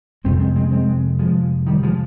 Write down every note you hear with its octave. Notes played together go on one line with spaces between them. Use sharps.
F2 C3 G#3 C4
G#3 C4
G#3 C4
G#3 C4
F3 G#3
D#3 G3
F3 G#3